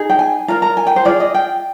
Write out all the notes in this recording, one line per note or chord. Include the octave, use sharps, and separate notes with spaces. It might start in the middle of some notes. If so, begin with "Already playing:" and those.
Already playing: D#4 G#4
G5
G#5
F4 A#4 A#5
A#5
G#5
G5
C5
F4 G#4 D5
D#5
G5